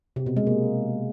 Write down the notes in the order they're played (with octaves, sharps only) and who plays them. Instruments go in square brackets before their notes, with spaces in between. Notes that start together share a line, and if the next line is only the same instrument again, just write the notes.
[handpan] C3
B2
G#3
A#3